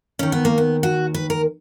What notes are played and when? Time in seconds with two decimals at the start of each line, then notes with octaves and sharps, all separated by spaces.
0.19 D#2 D#3 C#4
0.32 B3
0.45 A#3
0.58 B3
0.83 F#4
1.14 B4
1.30 A#4